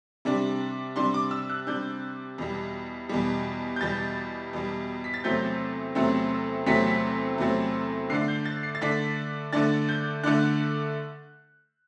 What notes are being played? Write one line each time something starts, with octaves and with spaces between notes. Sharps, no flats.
C3 G3 D4
C3 G3 D4 C6
D6
E6
F#6
C3 G3 D4 G6
E2 B2 G3
E2 B2 G3
G6
E2 B2 G3 A6
E2 B2 G3
B6
A6
E2 C3 F#3 A3 C4 G6
E2 C3 F#3 A3 C4
E2 C3 F#3 A3 C4 B6
E2 C3 F#3 A3 C4
D3 A3 D4 C7
G6
A6
C7
A6
D3 A3 D4 B6
D3 A3 D4 A6
G6
D3 A3 D4 F#6